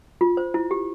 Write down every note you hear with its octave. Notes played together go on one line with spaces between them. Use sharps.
F4
C5
E4
G4